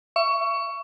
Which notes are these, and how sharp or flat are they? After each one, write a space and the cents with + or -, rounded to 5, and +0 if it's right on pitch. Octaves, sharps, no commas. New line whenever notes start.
E5 +30 C#6 +15